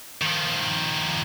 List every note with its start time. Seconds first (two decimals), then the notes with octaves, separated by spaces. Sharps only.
0.21 D#3 F3